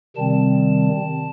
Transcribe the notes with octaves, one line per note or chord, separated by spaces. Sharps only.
C3 D#3 G3 C4 A5